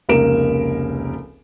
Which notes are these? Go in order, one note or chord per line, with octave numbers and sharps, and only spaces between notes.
F1 C#2 A#3 A#4 D7 E7